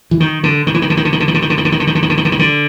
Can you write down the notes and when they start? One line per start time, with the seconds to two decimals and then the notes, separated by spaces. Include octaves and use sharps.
0.11 E3
0.20 D#3
0.44 D3
0.67 D#3
0.74 E3
0.82 D#3
0.90 D3
0.97 D#3
1.05 D3
1.13 D#3
1.20 D3
1.28 D#3
1.34 D3
1.42 D#3
1.50 D3
1.58 D#3
1.65 D3
1.72 D#3
1.80 D3
1.87 D#3
1.95 D3
2.02 D#3
2.10 D3
2.17 D#3
2.25 D3
2.32 D#3
2.39 D3